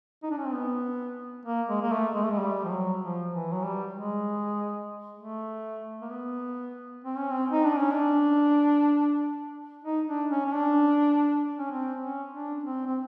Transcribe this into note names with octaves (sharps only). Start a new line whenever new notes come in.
D#4
D4
C#4
C4
B3
A#3
G#3
A#3
A3
G#3
A3
G#3
G3
F3
F#3
F3
E3
F#3
G3
G#3
A3
A#3
B3
C4
C#4
C4
D#4
D4
C#4
D4
D#4
D4
C#4
C#4
D4
C#4
C4
C#4
D4
C4
C4